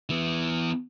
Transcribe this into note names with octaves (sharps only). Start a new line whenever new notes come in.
E3 B3